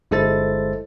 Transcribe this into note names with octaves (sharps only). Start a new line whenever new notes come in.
G1 G#3 E4 A4 C5 A6